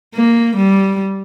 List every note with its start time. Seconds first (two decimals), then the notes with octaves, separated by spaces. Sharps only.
0.15 A#3
0.57 G3